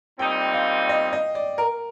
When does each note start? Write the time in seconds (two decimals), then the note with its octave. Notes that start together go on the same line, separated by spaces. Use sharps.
0.19 A#2 G3 C4 D#4 G5
0.54 F5
0.89 D#5
1.13 D#5
1.35 D5
1.58 A#4